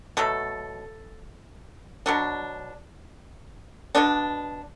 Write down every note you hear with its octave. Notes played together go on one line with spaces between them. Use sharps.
B2 F#3 A3 A4
B2 F#3 D4
B2 B3 D4